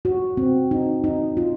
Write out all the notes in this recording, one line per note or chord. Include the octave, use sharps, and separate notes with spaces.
F#4
C4
D#4
D#4
F4